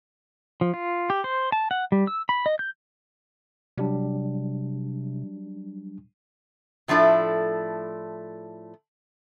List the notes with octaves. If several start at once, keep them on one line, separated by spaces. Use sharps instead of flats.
F3
F4
G4
C5
A5
F#5
G3
E6
B5
D#5
G6
C3 F#3 G3 D4
A2 F3 A3 D4 E4 A4